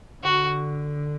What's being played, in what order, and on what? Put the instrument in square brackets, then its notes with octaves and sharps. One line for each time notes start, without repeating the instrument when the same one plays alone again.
[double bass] D3 [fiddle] F#4